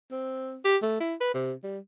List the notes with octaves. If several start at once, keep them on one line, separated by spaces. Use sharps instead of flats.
C4
G4
A3
E4
B4
C3
G3